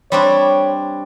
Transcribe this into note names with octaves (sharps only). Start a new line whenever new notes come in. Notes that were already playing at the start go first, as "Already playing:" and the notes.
G3 C4 D4 C#5